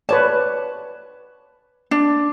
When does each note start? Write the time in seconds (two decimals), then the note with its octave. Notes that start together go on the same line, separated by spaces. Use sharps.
0.09 B4 C#5 D5 A5
1.91 D4